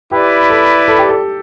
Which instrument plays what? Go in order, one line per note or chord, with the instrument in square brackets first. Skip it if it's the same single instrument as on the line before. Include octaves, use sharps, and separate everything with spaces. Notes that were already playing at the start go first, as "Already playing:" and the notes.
[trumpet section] E4 B4 D5 [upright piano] G4
[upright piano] A4
A4
G4
A4